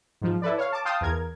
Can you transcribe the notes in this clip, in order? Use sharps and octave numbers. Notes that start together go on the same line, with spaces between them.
G#2 F3
E4 A4 B4 D5
C#5 F5
A5 D6
F5 G5 A5 C6 D#6
E2 A#4 G#6